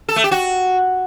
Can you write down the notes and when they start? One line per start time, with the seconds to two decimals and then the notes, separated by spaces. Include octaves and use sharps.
0.09 A4
0.16 A3
0.24 G4
0.31 F#4